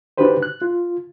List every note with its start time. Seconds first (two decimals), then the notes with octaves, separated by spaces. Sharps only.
0.18 D4 D#4 F#4 G4 B4 C5
0.43 F#6
0.62 F4